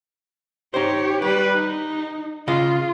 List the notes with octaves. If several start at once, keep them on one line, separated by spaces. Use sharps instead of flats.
D#4 G4 C5 C#5
G3 G4 B4
D#4
C#3 F4 D#5 F5